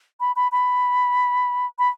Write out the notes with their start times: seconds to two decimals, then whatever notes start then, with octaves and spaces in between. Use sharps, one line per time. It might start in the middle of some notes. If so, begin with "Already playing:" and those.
0.20 B5
0.36 B5
0.52 B5
1.79 B5